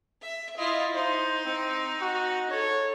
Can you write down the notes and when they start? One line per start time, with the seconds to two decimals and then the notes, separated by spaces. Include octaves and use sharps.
0.22 E5
0.57 E4 F4 D#5
0.95 D#4 C5
1.44 C4
2.01 F#4
2.50 A4 C#5